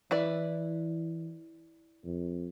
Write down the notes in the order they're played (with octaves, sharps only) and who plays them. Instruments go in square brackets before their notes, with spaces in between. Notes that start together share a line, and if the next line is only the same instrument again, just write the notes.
[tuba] E3 [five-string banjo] E4 B4 D5
[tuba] F2